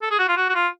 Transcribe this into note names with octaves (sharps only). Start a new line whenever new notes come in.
A4
G#4
F#4
F4
F#4
F#4
F4